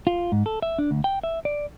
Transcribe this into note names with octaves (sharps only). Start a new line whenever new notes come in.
F4
G#2
A4
E5
D4
D2
G5
E5
D5